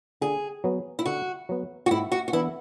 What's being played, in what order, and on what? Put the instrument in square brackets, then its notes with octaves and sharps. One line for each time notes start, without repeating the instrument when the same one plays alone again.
[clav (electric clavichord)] D3 [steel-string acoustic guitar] G#4
[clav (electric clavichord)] F#3 B3
[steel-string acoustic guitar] E4
[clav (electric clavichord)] D3 [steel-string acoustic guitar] F#4
[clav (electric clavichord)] F#3 B3
[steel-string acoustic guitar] F#4
[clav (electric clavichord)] G#2 [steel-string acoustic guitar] E4
[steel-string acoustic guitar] F#4
F#4
[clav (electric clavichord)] E3 B3 D4 [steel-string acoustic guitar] E4